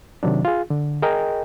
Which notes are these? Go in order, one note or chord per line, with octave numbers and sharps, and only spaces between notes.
C3 D#3 F#3 D4
F4 G#4
D3
G#4 A#4 D#5 G5